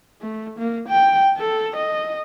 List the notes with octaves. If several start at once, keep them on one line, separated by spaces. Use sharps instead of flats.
A3
A#3
G5
A4
D#5